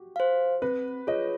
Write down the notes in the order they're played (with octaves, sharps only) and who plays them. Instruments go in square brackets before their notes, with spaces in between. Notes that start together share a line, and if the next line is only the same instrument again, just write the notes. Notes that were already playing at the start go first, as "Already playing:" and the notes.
Already playing: [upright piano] F#4 G4
[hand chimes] C5 F5
[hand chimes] C4 [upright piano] B4
[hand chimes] F4 G#4 C#5 [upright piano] D#5